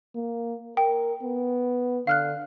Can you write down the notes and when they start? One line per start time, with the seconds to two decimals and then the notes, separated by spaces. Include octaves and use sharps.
0.15 A#3
0.77 A#4 G5
1.23 B3
2.07 D3 F5 F6 F#6